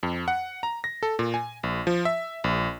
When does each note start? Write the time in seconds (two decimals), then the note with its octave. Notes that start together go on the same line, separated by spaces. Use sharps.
0.03 F2
0.28 F#5
0.63 A#5
0.84 A#6
1.03 A4
1.19 A#2
1.34 G#5
1.63 A#1
1.87 F3
2.05 E5
2.44 A#1